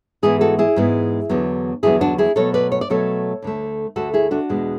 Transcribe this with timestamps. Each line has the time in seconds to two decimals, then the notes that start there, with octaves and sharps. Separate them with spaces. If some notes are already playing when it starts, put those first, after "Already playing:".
0.23 G#2 E3 G#3 B3 E4 G#4
0.41 F#4 A4
0.59 E4 G#4
0.76 G#2 E3 G#3 B3
1.29 E2 D3 F#3 B3
1.83 E2 D3 F#3 B3 E4 G#4
2.01 D4 F#4
2.18 E4 G#4
2.36 B2 F#3 A3 A4 C#5
2.54 B4 D5
2.72 C#5
2.81 D5
2.90 B2 F#3 A3 A4 C#5
3.42 D2 D3 A3
3.96 D2 D3 A3 F#4 A4
4.14 E4 G#4
4.31 D4 F#4
4.49 E2 B2 G#3